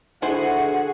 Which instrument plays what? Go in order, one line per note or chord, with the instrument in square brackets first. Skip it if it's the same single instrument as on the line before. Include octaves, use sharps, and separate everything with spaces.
[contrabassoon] D3 [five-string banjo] F3 E4 C5 [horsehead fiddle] F#4 G#4 [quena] F#5